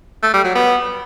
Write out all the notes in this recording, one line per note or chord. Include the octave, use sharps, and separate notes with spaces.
A3
G3
F#3
B3